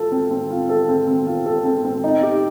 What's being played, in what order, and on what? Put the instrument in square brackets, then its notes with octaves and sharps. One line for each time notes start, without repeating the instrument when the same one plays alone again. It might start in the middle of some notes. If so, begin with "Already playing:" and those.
Already playing: [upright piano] F4 A4
C4
C4
F4
A4
C4
C4
F4
A4
C4
C4
D#4
G4